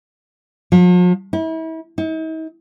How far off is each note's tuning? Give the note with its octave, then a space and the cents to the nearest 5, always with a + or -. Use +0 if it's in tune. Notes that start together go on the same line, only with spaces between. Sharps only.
F3 +45
E4 -35
D#4 +45